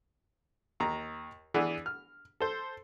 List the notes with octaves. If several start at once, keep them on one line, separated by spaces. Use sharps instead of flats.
D#2 A#5
E3 B3 D4 G#4
F6
A4 C5